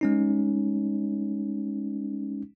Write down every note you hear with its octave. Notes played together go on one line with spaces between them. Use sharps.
G#3 C#4 D#4